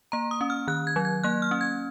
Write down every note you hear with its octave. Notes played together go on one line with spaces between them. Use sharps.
A#3 A#5
D#6
C#4
F6
D#3 F#6
G#6
F#3
G#6
A#3 F#6
F6
C#4
G#6